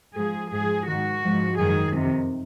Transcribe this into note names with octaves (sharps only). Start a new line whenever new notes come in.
G#2 F3 G#4
G#2 F3 G#4
G#2 D#3 F#4
G#2 F3
F#2 D#3 G#4
F2 C3 D#3